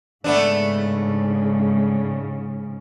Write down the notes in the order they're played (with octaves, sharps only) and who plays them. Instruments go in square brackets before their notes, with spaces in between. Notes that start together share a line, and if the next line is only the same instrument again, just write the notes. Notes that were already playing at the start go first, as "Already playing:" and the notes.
[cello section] G#2 C#3 [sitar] A3 B3 D4